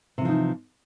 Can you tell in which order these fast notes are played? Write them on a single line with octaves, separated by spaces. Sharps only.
C3 E3 F3 D#4